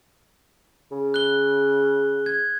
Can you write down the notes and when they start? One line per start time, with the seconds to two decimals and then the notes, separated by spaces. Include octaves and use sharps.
0.91 C#3
1.14 F#6 G7
2.26 G#6